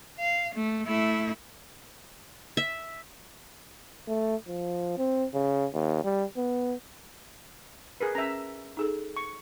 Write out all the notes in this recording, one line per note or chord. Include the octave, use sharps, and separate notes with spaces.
F5
A3
A3 E4
E5
A3
F3
C4
C#3
D#2
G3
B3
G#4 A#4 B4
C#4 E5 A#5
D#4 G#4 A4
C#6